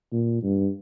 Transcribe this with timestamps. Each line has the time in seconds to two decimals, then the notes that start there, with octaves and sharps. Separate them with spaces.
0.12 A#2
0.43 G2